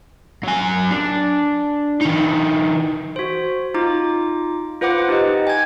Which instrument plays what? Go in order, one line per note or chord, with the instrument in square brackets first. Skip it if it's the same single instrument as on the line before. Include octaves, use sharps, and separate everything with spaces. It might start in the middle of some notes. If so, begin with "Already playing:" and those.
[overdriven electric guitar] F#3 G#5
D4
E3 D#4
[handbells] F#4 C5
D#4 F4 D6
F4 B4 C5 F#5 D6
D#4 G4 D#5
G5 G#5 G#6